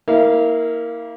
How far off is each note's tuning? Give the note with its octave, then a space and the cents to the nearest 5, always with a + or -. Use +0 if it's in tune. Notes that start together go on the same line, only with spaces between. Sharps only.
A#3 +0 E4 -35 F5 -20